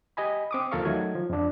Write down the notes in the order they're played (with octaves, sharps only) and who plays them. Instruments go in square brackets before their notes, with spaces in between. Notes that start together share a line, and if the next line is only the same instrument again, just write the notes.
[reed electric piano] G4 D#5 G#5 B5
C4 D6 D#6
D#2 F3 A4 A#4 F5 C#6
D#3 F#3 A3 G#6
F3
F2 D4